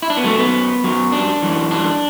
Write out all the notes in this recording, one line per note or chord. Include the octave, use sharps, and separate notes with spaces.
E4
D4
B3
F#2 F#3 A3
B3
F#2 F#3
D4
F#2 E3
D4